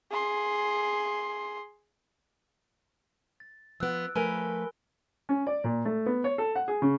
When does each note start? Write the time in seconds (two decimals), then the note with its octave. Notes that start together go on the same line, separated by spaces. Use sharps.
0.11 G#4 C6
3.40 A6
3.80 F3 B3 E6 F#6 D7
4.15 F3 A3 A#4 B4 G#5 B5 G7
5.29 C#4
5.47 D5
5.64 A#2
5.85 A3
6.06 B3
6.24 C#5
6.38 A4
6.55 F#5
6.68 G#4
6.82 C#3